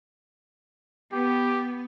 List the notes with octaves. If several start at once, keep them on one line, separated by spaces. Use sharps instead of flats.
B3 G4